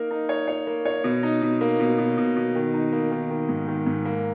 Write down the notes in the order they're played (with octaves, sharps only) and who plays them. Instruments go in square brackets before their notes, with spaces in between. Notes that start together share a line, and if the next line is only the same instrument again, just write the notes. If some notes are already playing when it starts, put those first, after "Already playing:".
Already playing: [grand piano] A#3 D#4 A#4
D#4
C#5
C#5
A#3
C#5
B2
D#4
B2
A#3
B2
B2
B2
B2
D#3
D#4
A#3
D#3
D#3
G#2
D#3
G#2
A#3